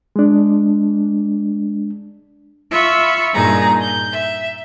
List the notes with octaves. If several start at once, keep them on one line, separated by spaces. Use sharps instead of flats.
G#3 D4
F4 E5 B5 C#6
G2 A#2 D#4 G#4 A#5
G6
E5